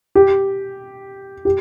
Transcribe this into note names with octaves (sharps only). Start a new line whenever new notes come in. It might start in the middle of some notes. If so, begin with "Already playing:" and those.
G4
G4